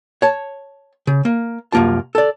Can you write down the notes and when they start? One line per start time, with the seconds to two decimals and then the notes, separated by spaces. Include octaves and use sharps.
0.22 C#5 A5
1.07 C#3
1.25 A#3
1.72 C2 F#2 A#3 F4 A5
2.15 A4 D5